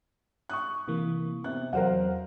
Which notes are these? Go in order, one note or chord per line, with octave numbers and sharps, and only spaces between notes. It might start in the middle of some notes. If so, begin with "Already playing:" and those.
C#6 D#6 F#6
C3 E3 A#3
C3 B3 F#6
E2 F#3 A#4 C5 F5 F#5